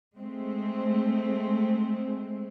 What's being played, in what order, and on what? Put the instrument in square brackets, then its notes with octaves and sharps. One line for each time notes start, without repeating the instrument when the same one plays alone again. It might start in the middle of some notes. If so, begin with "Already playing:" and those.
[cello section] G#3 A3 C4